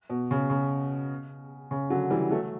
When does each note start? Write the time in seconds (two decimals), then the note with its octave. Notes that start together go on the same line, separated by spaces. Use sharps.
0.10 B2
0.31 C#3
0.50 C#3
1.71 C#3
1.90 D3 F#3
2.10 E3 G3
2.31 F#3 A3